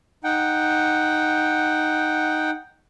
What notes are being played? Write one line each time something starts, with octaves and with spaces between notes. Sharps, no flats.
D#4 F#5 G5